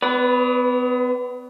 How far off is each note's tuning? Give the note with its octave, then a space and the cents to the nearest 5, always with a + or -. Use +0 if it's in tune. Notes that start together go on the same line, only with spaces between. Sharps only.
B3 +40 B4 +0 D5 -25